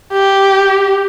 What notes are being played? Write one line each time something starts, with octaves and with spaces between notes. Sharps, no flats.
G4